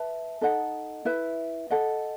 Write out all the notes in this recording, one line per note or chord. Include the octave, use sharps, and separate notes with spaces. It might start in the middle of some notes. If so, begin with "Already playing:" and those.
Already playing: B4 E5 A5
D#4 A4 D#5 F#5
E4 B4 E5
A4 D#5 F#5